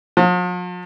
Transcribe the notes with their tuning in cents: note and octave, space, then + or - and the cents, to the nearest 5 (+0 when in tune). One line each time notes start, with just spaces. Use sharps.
F3 +45